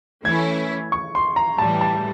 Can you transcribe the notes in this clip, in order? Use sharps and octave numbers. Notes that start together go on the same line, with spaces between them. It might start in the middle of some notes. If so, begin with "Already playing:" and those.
E3 A3 C#4 E4 G#6
C#6
C6
A#5
A2 E3 G3 A5
A5